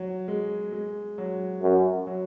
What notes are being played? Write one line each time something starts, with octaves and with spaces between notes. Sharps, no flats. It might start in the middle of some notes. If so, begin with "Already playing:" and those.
Already playing: F#3
G#3
G#3
F#3
F#2
F#3